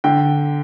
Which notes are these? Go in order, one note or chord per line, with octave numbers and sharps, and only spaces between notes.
D3 G5